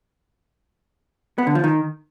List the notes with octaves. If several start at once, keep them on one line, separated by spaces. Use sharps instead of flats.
B3
D3
F3
D#3